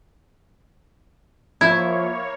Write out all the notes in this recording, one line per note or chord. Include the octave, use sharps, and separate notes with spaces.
F3 A#3 E4 C#5 G#6